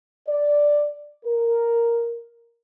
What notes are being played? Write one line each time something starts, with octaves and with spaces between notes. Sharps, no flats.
D5
A#4